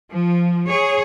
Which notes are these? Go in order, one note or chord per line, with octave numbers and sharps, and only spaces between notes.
F3
G#4 C#5